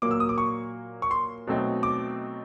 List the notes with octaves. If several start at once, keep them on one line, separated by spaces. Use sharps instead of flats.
A#2 F#3 A#3 D6
E6
D#6
D6
C#6
C#6
C6
B2 F#3 A3 C4 D#4
D6